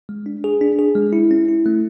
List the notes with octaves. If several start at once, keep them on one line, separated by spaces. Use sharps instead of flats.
G#3
D4
G#4
D4
G#4
G#3
E4
C#4
E4
A3